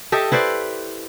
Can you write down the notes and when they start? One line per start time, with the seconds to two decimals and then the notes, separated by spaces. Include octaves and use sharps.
0.12 G4 A4 D#5 E5
0.32 E4 B4 C5 D5